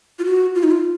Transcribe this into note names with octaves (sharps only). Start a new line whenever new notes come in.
F4
F#4
F4
D#4
F4